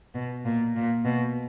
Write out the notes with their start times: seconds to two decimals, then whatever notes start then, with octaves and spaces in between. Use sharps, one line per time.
0.15 B2
0.45 A#2
0.76 A#2
1.05 B2